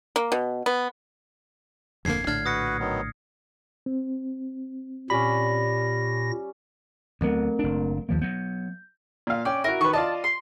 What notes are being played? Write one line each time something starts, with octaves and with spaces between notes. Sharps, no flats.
A#3
B2
B3
D1 F2 D3 A#3 G#6 C7
A#1 A2 D3 D4 F6 G#6
F#4 B4 D#6 A#6 C#7
D#3 F#3 B3
C4
A#2 G3 C#4 B5 A#6
D2 F#3 A3 B3 C4 A#4
F#1 D4
D#2 F3 A#3
F#3 B3 G6
A#2 F5
C#4 D5 G5
E4 F#4 A#4
D#3 B4 C#6
F4 D5 D#5 A5
C6